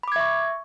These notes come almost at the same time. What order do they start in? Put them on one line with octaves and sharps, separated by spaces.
B5 D6 G#6 E5 C#6